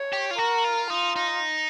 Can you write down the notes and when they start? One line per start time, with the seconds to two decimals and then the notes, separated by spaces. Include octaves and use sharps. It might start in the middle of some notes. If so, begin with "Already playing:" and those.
Already playing: C#5
0.13 G4
0.31 F4
0.38 F#4 A#4
0.64 F4
0.90 D#4 F4
1.16 D#4